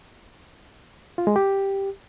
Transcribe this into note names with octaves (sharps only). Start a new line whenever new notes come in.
F4
G#3
G4